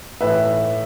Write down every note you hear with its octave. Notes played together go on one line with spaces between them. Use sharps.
A2 E3 B4 E5